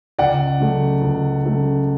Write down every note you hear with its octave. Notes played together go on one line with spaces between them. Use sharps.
C#2 D5 F#5
C#3 F#3 A3
C#2
C#3 F#3 A3